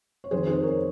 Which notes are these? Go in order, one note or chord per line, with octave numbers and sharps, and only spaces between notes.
C#5
F2 D#3 G#3 G#4 C5
G#4 C5
A#4 C#5